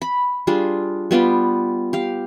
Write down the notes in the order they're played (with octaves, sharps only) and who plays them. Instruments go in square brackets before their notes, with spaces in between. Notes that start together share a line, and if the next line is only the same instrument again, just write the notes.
[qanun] B5
G3 D4 F4 G#4
G3 B3 F4 G4
G4 F5